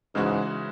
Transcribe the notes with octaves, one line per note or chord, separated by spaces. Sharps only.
G#2 C#3 E3 G#3 C#4 F#4